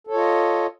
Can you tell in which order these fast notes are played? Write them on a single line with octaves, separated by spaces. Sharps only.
A4 C#5 F4 D#5